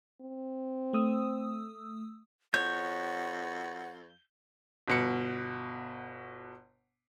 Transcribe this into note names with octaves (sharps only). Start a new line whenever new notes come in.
C4
A3 D#6 E6
F2 C#5 F#5 G6
G1 B2 C#7